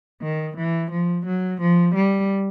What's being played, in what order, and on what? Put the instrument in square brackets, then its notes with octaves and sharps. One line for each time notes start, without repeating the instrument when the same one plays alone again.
[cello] D#3
E3
F3
F#3
F3
G3